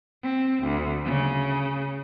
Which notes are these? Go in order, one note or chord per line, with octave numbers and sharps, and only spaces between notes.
C4
D2
C#3